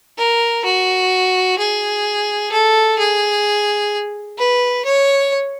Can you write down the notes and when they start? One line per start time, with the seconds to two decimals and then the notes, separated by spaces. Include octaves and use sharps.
0.18 A#4
0.65 F#4
1.58 G#4
2.52 A4
2.98 G#4
4.38 B4
4.85 C#5